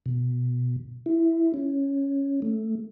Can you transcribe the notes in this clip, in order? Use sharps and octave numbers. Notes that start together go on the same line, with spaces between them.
B2
E4
C#4
A3